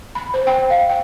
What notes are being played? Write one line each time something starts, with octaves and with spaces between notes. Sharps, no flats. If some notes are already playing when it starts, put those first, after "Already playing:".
B5
C5
G5
F5
G5